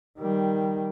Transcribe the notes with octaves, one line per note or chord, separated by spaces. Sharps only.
D#3 G3